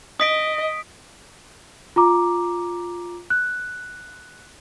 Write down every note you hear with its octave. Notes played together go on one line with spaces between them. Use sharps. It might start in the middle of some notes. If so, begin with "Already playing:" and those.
D#5 D#6 B6 D7
F4 A#5 D6
F#6